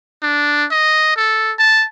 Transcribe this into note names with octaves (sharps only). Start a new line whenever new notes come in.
D4
D#5
A4
A5